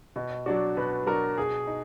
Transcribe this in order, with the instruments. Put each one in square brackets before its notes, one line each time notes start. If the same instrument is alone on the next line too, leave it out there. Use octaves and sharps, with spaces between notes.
[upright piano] B2 [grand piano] D#5
[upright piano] F#3 D4 F#4 [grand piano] D5
[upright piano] B2 [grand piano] B4
[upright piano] F#3 D4 F#4 [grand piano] A#4
[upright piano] B2 [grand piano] G#4
[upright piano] D#4